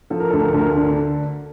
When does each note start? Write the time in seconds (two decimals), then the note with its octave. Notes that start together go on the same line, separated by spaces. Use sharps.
0.10 F3 A4
0.20 A#4
0.30 D2 A4
0.38 A#4
0.48 A4
0.54 D2 A#4
0.68 A4
0.76 D3 A#4
0.86 A4